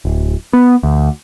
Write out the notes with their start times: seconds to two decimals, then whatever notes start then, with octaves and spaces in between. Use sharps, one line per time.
0.05 D1
0.53 B3
0.83 D2